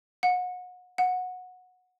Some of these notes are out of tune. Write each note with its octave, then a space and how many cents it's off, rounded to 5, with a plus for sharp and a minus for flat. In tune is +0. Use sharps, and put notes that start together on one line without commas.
F#5 -30
F#5 -15